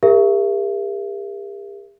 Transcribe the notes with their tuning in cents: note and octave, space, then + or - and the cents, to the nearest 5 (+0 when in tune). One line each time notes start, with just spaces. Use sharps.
G4 +45 A#4 +0 E5 +35